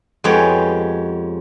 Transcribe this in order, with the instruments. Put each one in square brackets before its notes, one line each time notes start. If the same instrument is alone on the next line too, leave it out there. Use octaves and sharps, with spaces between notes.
[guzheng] F2 G#3 B3 G4 C#5